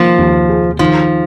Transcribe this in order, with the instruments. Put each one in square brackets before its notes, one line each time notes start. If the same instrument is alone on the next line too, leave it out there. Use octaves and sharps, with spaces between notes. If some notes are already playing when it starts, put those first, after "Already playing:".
Already playing: [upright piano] D#3 A#3 [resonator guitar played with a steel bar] F3
[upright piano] D#2
G#4
[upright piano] D#3 [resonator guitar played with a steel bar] F3